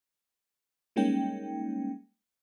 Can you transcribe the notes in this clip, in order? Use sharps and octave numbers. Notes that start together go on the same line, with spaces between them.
G3 G#3 A#3 C#4 D#4 G5